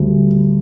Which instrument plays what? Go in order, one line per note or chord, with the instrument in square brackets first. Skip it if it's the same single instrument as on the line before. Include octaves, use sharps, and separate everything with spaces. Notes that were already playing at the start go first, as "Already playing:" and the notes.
Already playing: [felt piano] D2 G3